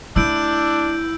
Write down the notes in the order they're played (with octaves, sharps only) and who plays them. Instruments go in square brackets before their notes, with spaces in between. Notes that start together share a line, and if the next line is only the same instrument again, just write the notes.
[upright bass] A3 [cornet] D4 [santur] E4 [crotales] E6 G6 D7